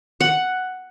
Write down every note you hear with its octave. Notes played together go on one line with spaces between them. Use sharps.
F#5